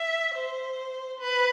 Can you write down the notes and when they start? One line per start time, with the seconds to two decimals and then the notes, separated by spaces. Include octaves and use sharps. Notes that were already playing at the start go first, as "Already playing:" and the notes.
Already playing: E5
0.34 C5
1.19 B4